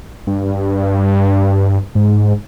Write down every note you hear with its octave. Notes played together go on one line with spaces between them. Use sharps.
G2
G#2